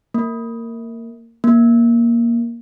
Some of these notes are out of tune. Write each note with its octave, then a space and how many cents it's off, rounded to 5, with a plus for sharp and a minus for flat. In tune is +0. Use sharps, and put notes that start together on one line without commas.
A#3 -20
A#3 +10